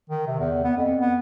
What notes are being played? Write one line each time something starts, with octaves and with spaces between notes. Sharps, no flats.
D#3
C3
E2
B3
F2
B3